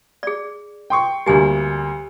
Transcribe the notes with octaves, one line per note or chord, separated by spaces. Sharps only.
G#4 D5
G5 C6 C#6
D2 G3 A#3 G4 G#5